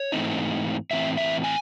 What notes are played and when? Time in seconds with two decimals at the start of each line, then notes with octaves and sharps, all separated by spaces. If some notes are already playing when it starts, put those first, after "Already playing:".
Already playing: C#5
0.12 G#2 E3 A3 C4 D#4
0.91 A2 E3 C4 E5
1.18 E5
1.44 G#5